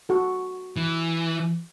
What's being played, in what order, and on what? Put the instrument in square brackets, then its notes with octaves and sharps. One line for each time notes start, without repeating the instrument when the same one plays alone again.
[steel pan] F#4 A4
[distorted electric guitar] E3